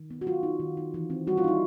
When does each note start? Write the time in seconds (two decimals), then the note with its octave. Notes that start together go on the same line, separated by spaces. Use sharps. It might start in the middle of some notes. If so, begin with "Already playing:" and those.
Already playing: D#3
0.11 B3
0.21 F#4
0.26 F#3 F4
0.43 D#4
0.60 D#3
0.77 D#4
0.94 E3
1.10 C4
1.27 G3 F#4
1.37 F4
1.44 D#4 E4